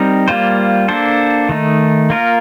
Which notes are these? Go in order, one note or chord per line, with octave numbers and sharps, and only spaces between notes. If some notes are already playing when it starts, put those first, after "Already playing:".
Already playing: G3 C4 D#4 A#4
G3 A#3 F4 C5
A#3 D4 A4 C5
D#3 A3 D#4
A#3 F4 A#4